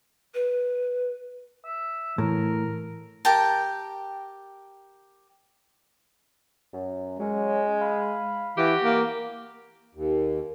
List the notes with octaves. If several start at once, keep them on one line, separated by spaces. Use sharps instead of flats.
B4
E5
A2 E3 A#4
G4 A#4 G5 A5
F#2
F#3 G#3 C#4
F5 B5
E3 F#4 G4
A#3
D#2